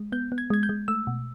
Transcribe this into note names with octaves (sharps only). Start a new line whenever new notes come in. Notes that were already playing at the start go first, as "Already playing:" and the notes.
Already playing: G#3
B3 G6
B3
G#6
G#3 G#6
G6
G#3
A3 E6
B2